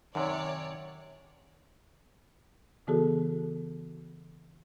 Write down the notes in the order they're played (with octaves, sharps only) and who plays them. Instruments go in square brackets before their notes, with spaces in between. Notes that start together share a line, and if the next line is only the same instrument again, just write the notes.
[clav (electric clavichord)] F#2 C3 [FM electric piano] D#3 [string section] C#5 D5
[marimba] C#3 E3 B3 F#4 G#4 A4